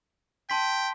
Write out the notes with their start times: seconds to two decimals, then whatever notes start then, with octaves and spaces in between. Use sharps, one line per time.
0.50 G5 A5 C6 B6